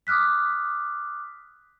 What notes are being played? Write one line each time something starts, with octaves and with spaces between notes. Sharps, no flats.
D6 D#6 F6 F#6 B6